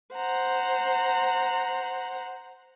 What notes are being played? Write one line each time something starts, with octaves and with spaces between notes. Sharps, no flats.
C5 F#5 A#5